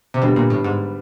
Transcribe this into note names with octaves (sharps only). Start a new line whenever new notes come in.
C3
B2 D3 G3 B3 D4 G4
A#2
A2
G#2